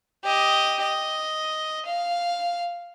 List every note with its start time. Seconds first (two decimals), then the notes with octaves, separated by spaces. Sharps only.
0.24 G4 D#5
0.81 D#5
1.85 F5